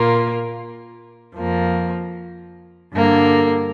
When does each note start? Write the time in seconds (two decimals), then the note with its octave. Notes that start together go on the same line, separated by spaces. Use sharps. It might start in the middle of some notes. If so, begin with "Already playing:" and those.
Already playing: A#2 A#3 F4
1.34 F2 F3 A#3
2.93 G2 D3 A#3